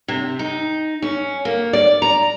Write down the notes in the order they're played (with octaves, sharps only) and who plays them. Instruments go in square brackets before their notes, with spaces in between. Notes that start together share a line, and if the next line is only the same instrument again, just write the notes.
[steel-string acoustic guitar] C3
D#4
C#4
A#3
D5
A#5